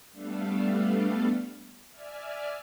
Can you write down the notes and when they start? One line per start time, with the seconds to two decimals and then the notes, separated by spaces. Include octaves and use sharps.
0.12 G3 A3 B3 D4 A4 F5
1.89 D5 E5 G#5 F6